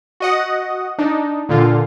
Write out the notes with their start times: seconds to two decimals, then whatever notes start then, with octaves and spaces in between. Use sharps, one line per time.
0.20 F#4 D#5 F#5
0.98 D4 D#4
1.49 A#2 D3 F4